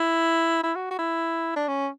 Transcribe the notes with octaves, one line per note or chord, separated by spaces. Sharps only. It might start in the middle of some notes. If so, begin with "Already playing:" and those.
Already playing: E4
E4
F#4
F#4
E4
D4
C#4